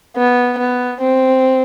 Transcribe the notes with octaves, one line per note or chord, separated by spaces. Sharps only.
B3
B3
C4